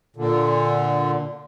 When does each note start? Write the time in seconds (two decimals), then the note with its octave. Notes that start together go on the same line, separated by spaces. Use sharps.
0.16 A#2 D3